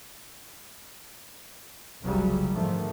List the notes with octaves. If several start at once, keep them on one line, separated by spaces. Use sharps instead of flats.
F1 C2 C#3 F#3 G3
G#2 D3 D#3 F3 A3